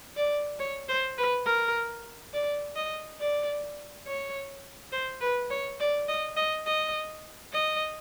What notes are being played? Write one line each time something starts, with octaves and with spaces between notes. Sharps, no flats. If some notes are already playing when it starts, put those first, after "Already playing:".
D5
C#5
C5
B4
A#4
D5
D#5
D5
C#5
C5
B4
C#5
D5
D#5
D#5
D#5
D#5